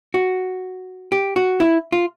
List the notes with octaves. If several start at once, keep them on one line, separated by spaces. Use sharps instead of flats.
F#4
G4
F#4
E4
F4